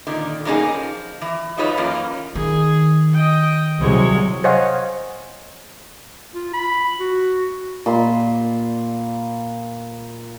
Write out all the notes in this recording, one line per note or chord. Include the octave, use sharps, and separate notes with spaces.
A#2 D3 D#3
B2 F#3 A#3 C#4 D#4 G#4
F3
E3
F#3 D#4 F4 B4 C#5 D#5
F#2 E3 A#3 F4
D#3 G#4
D#5 G5
C2 C3 F#3 G#3 C#5
C5 C#5 D#5 F5 F#5 G#5
F4
B5
F#4
A#2 B5 C6